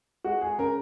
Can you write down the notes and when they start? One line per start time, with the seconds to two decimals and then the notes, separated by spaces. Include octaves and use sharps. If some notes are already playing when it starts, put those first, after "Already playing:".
0.24 G#3 F#4
0.41 G#4
0.58 C#3 A#4